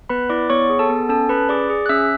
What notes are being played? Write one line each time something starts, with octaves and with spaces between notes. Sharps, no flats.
B3 B4 B5
E4 D5 D6
B3 C#5 C#6
G#4
A4 A5
B3
C#4 A4 A5
C#4 B4 B5
G#4 D5 D6
G#4
F#6
C#4 E5 E6